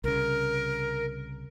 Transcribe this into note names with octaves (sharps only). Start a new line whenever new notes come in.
C2 C#3 A#4